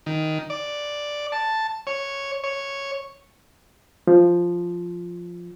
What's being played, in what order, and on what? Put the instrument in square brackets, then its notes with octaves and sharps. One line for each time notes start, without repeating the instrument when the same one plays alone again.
[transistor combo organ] D#3
D5
A5
C#5
C#5
[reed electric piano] F3